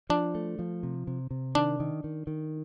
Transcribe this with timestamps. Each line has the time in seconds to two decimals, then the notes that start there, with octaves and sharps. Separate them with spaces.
0.10 F3 D4
0.35 A3
0.59 F3
0.83 C3
1.07 C3
1.31 C3
1.55 D#3 D4
1.80 D#3
2.04 D#3
2.27 D#3